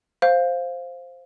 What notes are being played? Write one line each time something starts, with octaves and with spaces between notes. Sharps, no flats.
C5 F5